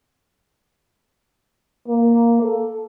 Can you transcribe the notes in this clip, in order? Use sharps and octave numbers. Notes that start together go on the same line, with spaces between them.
A#3
A4